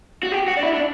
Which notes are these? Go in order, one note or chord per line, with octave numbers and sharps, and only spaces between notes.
F#4
G4
F#4
D4
E4
D4